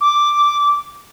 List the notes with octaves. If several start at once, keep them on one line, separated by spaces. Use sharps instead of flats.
D6